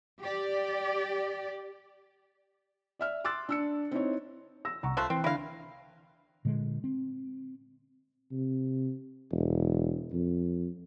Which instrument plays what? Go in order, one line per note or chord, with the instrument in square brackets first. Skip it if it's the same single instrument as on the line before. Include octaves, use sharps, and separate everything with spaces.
[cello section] G4 D5
[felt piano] D5 E5 F6
C6 D6 E6 F#6 A6
D4 E6 C#7
C4 D#4 E4 C#5
E6 A#6
[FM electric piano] C2 [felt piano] F#5 A#5 C#6
[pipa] F3 A3 C5 [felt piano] F#6
[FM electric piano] E3 [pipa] C4
[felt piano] D3 B5 A#6 [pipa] E4 F5
[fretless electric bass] A#2 D3 G#3
C4
[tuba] C3
E1
F2